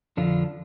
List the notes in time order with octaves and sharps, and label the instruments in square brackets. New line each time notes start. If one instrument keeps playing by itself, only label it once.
[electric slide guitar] F2 D3 F3 D4 F4